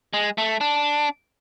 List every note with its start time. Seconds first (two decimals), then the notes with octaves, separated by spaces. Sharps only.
0.14 G#3
0.38 A3
0.61 D4